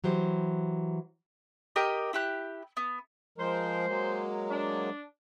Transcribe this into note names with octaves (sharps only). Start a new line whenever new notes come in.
E3 F#3 G4 C5
G4 A#4 D#5 G5
E4 G4 F#6
B3
F3 G#3 A#4 C5
F#3 G#3 A#3
D4